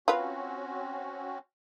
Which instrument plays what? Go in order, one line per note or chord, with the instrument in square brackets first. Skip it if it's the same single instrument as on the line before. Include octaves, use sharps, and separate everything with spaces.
[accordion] C4 C#4 F#4 [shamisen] F4 B4